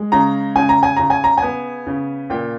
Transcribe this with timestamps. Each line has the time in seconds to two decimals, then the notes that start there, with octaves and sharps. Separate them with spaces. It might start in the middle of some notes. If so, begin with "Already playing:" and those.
Already playing: G#3
0.12 C#3 A#5
0.56 C#3 G#5
0.69 A#5
0.83 G#5
0.96 C#3 A#5
1.10 G#5
1.24 A#5
1.38 B3 G#5
1.87 C#3
2.30 A#2 G5